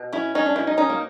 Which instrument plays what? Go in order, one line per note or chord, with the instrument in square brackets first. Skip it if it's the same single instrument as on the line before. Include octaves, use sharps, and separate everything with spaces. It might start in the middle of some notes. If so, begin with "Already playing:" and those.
Already playing: [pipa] B2
[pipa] C#4 [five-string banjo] E4
[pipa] C#4 [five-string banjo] D#4
[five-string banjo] D4
[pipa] B2 [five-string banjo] E4
[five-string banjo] D#4
[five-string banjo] C#4 [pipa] D#4
[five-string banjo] A#3